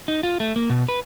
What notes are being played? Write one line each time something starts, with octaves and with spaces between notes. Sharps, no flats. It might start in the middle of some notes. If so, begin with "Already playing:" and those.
D#4
F4
A3
A#3
B2
B4